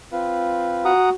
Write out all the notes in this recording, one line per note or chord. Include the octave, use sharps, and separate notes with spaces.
C4 F4 B4
F#4 F#5 A#5 D#6